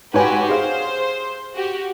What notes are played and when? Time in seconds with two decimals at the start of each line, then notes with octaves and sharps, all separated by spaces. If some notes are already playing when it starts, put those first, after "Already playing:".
0.14 G#2 F#4 G4 B4 C#5 G#5
0.49 G#4 C5 F5
1.56 F#4 G4